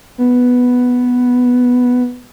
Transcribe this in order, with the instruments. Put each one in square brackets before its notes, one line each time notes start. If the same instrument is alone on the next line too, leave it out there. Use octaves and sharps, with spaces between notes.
[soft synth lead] B3